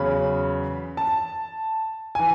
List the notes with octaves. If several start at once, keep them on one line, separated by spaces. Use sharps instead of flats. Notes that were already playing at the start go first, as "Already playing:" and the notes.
Already playing: E2 C#3 F#3 B5
A5
E3 G#5